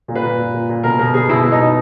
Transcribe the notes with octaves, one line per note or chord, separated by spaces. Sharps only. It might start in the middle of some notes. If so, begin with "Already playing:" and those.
A#2
B4
A#2
A#2
A#2
A#2
B2 A#4
B2 A#4
B2 G#4
B2 E4
B2
D#4
B2